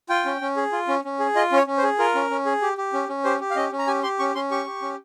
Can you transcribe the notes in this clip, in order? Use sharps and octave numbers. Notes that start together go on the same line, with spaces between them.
F4 G5
C#4
C#4
G#4
F4
C#4
C#4
G#4
F4 D#5
C#4 C#5
C#4
C5
G#4
F4 A#4
C#4
C#4
G#4
G4
G4
C#4
C#4
G4 C5
G4
F5
C#4 D#5
C#4
A#5
G4 G#5
G4 C6
C#4 C#6
C#4 C6
G4 C#6
G4
C#4